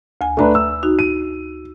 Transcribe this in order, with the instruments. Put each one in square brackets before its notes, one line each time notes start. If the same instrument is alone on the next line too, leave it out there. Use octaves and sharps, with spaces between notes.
[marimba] D2 G#5
[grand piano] A3 D4 B4 [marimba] E5 A#5
[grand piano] E6
[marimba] D#4 F#4
[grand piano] D#7